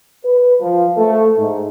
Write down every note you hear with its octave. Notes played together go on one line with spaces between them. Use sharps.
B4
F3
A3
G#2